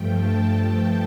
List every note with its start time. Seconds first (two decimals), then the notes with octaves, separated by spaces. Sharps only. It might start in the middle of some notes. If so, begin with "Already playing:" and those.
Already playing: G2 F3 A3 G5
0.12 A5
0.52 A5